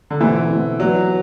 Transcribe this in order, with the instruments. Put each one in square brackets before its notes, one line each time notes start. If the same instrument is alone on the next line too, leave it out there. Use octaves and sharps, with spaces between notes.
[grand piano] D3
[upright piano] B2 A3 C4 E4 [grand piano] E3
[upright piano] B2 A3 C4 E4
[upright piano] E3 B3 D4 [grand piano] F#3